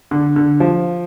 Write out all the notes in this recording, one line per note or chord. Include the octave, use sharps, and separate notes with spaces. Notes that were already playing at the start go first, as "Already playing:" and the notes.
D3
D3
F3